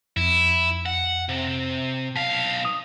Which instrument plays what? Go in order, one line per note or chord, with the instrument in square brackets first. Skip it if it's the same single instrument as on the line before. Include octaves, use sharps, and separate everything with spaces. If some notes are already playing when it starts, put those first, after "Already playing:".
[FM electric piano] F2 [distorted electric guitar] E4
[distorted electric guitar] F#5
C3
[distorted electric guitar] B1 F5 [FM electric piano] A5 B6
[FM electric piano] D#6